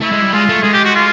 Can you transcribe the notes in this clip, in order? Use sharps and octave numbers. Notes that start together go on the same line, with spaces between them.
A3 E4
G#3
G3
G#3 F4
A3
G#3 G#4
G4
F#4
F4